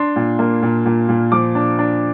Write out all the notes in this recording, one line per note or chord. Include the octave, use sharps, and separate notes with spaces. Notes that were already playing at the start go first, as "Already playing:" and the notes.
Already playing: D4 C6
A#2
A#3
A#2
A#2
A#2
F3 D6
D4
D4